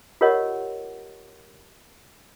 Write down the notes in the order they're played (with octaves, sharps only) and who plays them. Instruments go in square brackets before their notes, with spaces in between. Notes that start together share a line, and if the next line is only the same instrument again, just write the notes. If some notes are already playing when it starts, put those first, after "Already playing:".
[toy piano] F4 G4 A#4 C#5 D#5 F#5